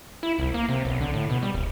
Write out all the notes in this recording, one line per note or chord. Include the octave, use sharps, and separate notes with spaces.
E4
C2
A#3
C3
B1
D3
A2
B2
G3
D1